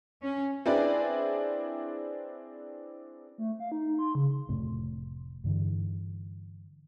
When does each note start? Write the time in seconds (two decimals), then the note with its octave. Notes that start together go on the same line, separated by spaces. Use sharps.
0.23 C#4
0.66 C4 D4 E4 G#4 B4 D5
3.38 A3
3.60 F5
3.72 D#4
3.99 C6
4.15 C#3
4.49 F1 A2 A3 C4
5.44 G2 D3 E3